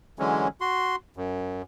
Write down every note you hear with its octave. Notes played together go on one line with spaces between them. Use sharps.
D3 E3 F#3 G#3 C#4
F#4 C6
F#2